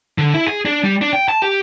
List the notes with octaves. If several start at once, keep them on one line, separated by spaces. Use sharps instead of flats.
D3
E4
G#4
D4
G3
D4
G5
A5
G4